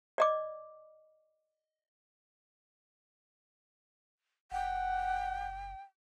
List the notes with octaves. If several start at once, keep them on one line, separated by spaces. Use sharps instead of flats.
D5 D#5 D6
F#1 F#5 G5